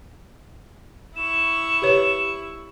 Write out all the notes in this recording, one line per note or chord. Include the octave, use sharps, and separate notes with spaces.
E4 C#6 E7
G4 B4 C#5